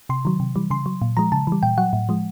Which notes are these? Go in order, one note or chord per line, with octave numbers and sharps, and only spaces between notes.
C3 C6
D#3 F#3
C3
E3 G3
C#3 C6
F#3
A#2
F3 G#3 A#5
C#3 A5
E3 G3
A#2 G5
F#3 F#5
A2
F3 G#3